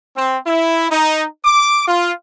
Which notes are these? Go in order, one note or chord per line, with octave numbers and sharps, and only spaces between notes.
C4
E4
D#4
D6
F4